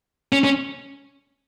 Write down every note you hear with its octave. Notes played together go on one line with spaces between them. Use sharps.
C#4
C#4